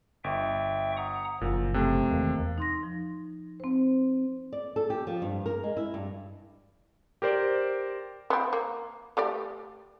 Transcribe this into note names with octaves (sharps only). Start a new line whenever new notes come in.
G1 E5 G5 C#6
F#5 A#5 D#6
F#1 A#2 F3
C3 A3
E2 D#3 G#3 A#3
D#4 C6 A#6
F3
C4 C5
D5
A4
G4
F3
G2
A#4
G#3
E4
G2
G4 A#4 C5 D5
B3 C4
A#3
A3 G4 D5